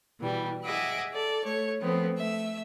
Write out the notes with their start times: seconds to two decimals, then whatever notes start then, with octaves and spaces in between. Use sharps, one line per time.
0.19 B2 E3 G3
0.64 G#4 D#5 E5 F#5 D6
1.13 A4 D5 A5
1.44 A3 C#5
1.80 F3 A3 B3 C4
2.18 A3 E5 E6